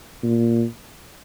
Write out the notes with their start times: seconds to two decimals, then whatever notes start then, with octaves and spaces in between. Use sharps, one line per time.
0.23 A#2